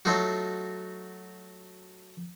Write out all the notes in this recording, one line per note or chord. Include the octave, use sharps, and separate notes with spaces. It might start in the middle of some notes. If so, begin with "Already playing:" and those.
F#3 A3 D#4 F4 F#4